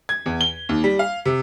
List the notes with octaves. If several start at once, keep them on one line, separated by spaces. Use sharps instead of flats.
G#6
E2
G7
D#2
G3
F5
C3